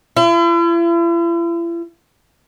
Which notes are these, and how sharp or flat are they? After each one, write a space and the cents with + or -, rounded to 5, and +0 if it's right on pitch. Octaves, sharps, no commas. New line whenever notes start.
E4 +45